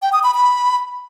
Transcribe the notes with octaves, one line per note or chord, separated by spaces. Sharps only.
G5
D#6
B5
B5